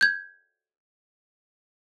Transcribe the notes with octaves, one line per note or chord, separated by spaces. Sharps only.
G6 G#6